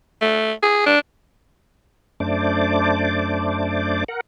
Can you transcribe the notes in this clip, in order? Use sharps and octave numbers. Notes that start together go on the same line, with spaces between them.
A3
G#4
D4
F#2 A3 D4 C5 D5 D6
A#4 F#5